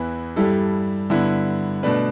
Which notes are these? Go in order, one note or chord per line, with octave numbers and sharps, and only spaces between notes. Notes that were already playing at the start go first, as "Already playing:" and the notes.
Already playing: E2 E3 B3 E4 B4
G2 G3 E4 A4
G2 D3 B3 E4
B2 A3 D4 B4